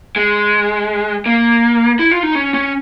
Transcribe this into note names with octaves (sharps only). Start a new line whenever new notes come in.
G#3
A#3
E4
F4
D#4
C#4
C#4